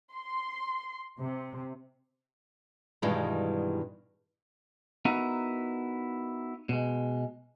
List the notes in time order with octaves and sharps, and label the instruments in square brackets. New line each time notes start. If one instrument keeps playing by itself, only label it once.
[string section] C6
C3
[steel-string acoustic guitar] G2 B2 D#3 E3 G3 G#3
[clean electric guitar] B3 D#4 E4 F#4 A#4
B2 G#3